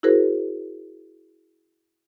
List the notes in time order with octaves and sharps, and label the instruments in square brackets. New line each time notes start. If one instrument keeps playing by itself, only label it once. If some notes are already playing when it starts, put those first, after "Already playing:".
[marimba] E4 F#4 G#4 A#4 C5